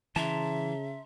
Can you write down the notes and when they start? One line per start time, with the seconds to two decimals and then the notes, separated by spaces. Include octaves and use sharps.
0.16 C#3 E3 E5 A5 A#5 C6